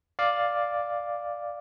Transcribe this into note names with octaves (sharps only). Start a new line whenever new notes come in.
D5 F5